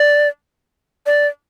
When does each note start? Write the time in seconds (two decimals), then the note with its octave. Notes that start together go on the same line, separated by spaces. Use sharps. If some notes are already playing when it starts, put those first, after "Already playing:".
Already playing: D5
1.06 D5